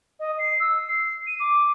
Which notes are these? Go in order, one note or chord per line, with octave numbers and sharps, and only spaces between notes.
D#5
C7
E6
C7
D#7
D6